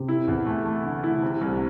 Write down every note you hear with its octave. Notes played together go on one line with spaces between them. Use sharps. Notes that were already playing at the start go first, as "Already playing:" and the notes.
Already playing: C3
E4
E2
A3
A3
D3
E4
C3
C2